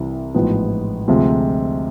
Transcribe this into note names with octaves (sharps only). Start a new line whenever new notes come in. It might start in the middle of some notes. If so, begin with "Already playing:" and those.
Already playing: C2 C3 E3
A1 G#2 F3 B3
D2 C3 F3 G#3 C4